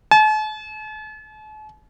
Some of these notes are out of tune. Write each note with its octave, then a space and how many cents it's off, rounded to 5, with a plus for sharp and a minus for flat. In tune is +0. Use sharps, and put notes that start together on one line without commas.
A5 -45